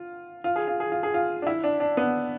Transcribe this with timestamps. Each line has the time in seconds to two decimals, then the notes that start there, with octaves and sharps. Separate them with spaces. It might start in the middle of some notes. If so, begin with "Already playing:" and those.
Already playing: F4
0.44 F4
0.56 G#4
0.68 F4
0.80 G#4
0.92 F4
1.03 G#4
1.14 F4
1.42 D4
1.47 E4
1.64 D4
1.80 D4
1.97 B3